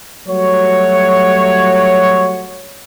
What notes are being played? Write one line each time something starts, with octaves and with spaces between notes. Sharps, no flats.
F#3 G3 A3 F#4 C#5